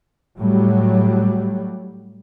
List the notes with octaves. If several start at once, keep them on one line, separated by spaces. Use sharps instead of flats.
A2 F#3 G3